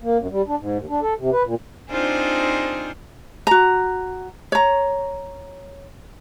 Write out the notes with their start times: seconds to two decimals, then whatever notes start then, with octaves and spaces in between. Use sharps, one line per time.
0.02 A#3
0.19 F#2
0.30 G3
0.48 D4
0.60 G#2
0.78 D#2
0.89 D4
1.02 A4
1.18 C3
1.32 B4
1.45 A#2
1.91 C4 D4 D#4 F4 G#4 C5
3.47 F#4 A#5
4.52 C#5 A#5